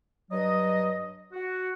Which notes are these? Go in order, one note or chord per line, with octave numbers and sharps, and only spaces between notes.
G2 F#3 D#5
F#4